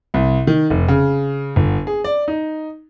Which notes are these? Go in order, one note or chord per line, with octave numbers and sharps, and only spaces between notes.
C2
D#3
F1
C#3
G1
G#4
D5
D#4